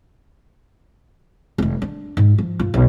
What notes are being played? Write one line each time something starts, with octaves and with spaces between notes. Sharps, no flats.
F1 F3
D4
G#2
F3
G2 F4
B1